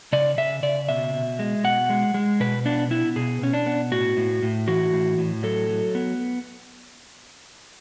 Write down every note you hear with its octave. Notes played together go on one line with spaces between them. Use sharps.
C#3 D5
C#3 E5
C#3 D5
B2 E5
B2
G#3
B2 F#5
G#3
G#3
B2 B4
B3 D4
B3 E4
B2 G#4
B2 C#4
D4
B3
A2 F#4
A2
A2
E3 F#4
A2
A2
F#3 A4
F#3
B3